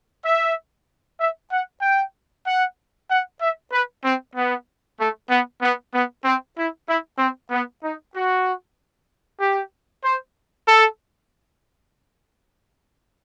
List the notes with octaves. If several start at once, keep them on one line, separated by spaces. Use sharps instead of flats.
E5
E5
F#5
G5
F#5
F#5
E5
B4
C4
B3
A3
B3
B3
B3
C4
E4
E4
C4
B3
D#4
F#4
G4
C5
A4